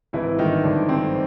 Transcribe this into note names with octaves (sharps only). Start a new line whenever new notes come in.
G#1 E3 E4
G2 D3 D#3 F3 D#4
G#1 D3 D4
G2 D3 F3 C4